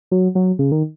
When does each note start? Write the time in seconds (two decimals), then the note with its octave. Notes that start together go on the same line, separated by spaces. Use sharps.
0.11 F#3
0.35 F#3
0.59 C#3
0.72 D#3